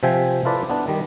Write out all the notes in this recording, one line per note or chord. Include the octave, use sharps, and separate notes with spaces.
C3 F3 E5 G5 G#5
E4 F4 A4 B4 D5
B3 D4
D#3 G3